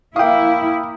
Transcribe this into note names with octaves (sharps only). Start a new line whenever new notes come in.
A#3 E4 F5 G5 D#6